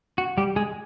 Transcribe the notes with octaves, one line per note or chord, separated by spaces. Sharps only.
F#4
G3 G4
G#3 G#4